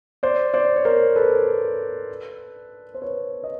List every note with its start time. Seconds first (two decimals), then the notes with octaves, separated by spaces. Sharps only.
0.23 C5 D5
0.54 C5 D5
0.76 C#5
0.85 A#4 C5
1.16 A4 B4
2.94 C5
3.02 B4 C#5
3.44 D#5